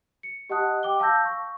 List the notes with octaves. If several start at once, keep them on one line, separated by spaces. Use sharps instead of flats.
C#7
G4 D#5 F#5 A5 D#6 F#6
G5 D6 G7
F5 A5 E6 G6 A#6
C#6